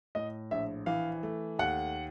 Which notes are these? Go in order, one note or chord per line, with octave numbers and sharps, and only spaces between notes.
A2 D#5
A#1 E5
E3 F5
A3
D#2 F#5